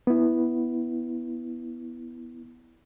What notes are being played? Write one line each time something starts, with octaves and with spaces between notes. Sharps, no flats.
B3 E4